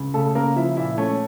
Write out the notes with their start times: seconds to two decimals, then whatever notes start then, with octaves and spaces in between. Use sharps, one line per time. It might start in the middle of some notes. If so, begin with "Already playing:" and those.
Already playing: C#2
0.14 C#3 A3 A4
0.35 C#2 A#3 A#4
0.56 F3 E4 E5
0.77 A#2 E4 E5
0.98 A3 C#4 C#5